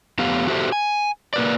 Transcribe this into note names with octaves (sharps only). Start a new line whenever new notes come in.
F2 A3 B3 G4 F5
F#4 G4 A4 C5 E5
G#5
A#3 B4 D5